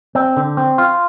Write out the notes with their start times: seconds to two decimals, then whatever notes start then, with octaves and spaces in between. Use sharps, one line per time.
0.15 C4
0.37 D3
0.57 C4
0.78 F4